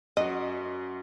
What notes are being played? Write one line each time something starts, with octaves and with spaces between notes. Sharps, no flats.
F#2 F#4 D#5